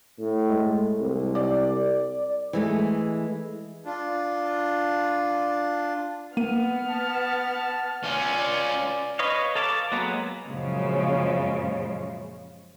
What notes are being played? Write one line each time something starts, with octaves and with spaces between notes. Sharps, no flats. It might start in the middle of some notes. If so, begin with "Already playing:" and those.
A2
G#3
C2
D5
E3 G#3 A3
D4 F4
A#3 B3 F6 D#7
A5
C#4 F4 D5
B4 C#5 D#5 F5
A4 F5 A5 A#5 D6
F#3 G#3 A#3 B3
F#2 A#2 C#3 F3 G#3